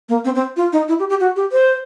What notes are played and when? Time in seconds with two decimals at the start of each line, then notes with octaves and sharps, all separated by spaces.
0.09 A#3
0.25 C4
0.35 C4
0.56 F4
0.72 D#4
0.88 E4
0.99 G4
1.10 G4
1.20 F#4
1.36 G4
1.52 C5